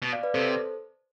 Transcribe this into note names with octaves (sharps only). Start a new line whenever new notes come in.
B2
D5 F5
B4 D5
C3 A4 C5